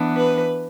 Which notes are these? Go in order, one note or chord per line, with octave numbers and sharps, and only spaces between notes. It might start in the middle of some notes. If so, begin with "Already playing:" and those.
Already playing: E3 B3 D4
B4